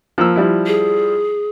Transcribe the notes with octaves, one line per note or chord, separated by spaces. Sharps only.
F3 A#3 E6
F3 G3 E4
G#4